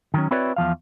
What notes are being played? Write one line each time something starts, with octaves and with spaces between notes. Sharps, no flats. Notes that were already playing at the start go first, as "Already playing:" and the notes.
D#3 F#3 C#4
C4 E4 F#4 B4 C#5 D5
E2 F3 F5